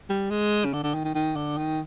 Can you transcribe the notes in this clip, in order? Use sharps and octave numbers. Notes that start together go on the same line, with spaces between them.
G3
G#3
C#3
D3
D3
D#3
D#3
D#3
D3
D#3